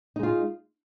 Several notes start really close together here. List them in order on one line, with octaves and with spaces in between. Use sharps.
D#4 G#3 F4